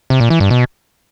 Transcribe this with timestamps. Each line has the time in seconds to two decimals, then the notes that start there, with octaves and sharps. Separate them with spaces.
0.10 C3
0.20 A#2
0.30 E3
0.40 G2
0.50 B2